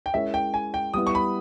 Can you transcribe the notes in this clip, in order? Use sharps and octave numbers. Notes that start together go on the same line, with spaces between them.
G5
G#3 C#4 E4 A#4 C#5 E5
G5
G#5
G5
G3 B3 E4 D#6
C#6
B5